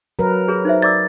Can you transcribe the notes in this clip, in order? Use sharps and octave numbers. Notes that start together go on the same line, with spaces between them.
F#3 A#4 B4
G#4 C#5 A#5
D#4 C5 E5
D5 D6 E6 A6